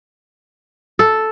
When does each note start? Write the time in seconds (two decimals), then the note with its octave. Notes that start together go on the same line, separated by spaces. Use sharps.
0.99 A4